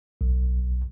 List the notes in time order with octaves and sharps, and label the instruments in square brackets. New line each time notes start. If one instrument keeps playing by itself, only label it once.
[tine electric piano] B1